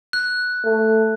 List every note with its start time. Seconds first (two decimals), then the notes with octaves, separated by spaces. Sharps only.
0.13 F#6
0.64 A3